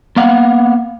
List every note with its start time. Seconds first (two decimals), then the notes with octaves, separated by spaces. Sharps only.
0.16 A#3 B3 F5 F#5